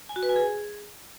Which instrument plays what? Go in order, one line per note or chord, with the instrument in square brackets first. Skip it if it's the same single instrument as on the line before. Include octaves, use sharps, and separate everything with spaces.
[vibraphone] G#5
F#4
B4
G#5
G#4